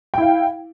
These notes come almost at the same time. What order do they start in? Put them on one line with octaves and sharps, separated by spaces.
G5 E4 F5